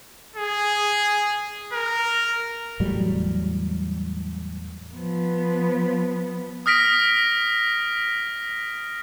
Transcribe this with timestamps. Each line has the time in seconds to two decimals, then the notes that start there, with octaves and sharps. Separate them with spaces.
0.36 G#4
1.73 A#4
2.80 E2 A2 F#3 G3
4.95 F3 B3
6.66 D#6 F6 A#6 B6 D7